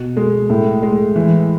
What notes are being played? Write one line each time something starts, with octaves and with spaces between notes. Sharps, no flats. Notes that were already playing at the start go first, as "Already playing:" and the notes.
Already playing: B2
G#3
A2
G#3
E3